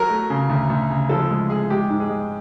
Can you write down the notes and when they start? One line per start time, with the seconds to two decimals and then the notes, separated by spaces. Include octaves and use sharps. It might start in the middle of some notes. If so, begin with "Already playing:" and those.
Already playing: F#3 A#4
0.10 A3
0.30 C#3
0.50 D2
0.70 D2
0.90 C#3
1.09 F3 A4
1.31 G#3
1.49 G#3 G#4
1.70 G#3 G4
1.90 G#2
2.00 G#4
2.10 G#3